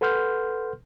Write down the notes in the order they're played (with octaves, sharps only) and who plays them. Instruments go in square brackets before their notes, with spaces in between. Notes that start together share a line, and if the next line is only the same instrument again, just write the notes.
[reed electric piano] A4 B4 F#5 C6 F6 G6